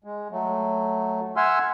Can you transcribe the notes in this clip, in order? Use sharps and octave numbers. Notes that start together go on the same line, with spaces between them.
G#3
F#3 A3
E5 F#5 G#5 C6 E6 F6